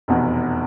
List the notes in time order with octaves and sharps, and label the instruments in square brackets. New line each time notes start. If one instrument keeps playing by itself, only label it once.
[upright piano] F1 E2 B2